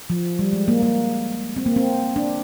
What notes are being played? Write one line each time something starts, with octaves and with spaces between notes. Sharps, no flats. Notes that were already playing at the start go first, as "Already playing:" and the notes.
F3
G3
G#3
A#3
A#3
C4
A#3
C4
D4